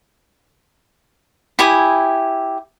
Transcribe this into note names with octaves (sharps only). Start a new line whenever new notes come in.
E4 G4 G#5 D#6